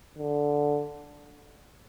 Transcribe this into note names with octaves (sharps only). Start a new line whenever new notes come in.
D3